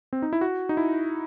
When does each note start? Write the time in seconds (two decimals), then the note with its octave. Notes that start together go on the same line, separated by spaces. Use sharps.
0.13 C4
0.22 D#4
0.33 E4
0.41 F#4
0.69 D#4
0.77 E4